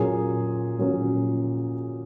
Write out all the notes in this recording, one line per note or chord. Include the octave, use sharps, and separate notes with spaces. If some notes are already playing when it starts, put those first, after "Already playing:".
Already playing: A#2 F#3 A#3 C#4 G#4
A#2 F#3 A#3 C#4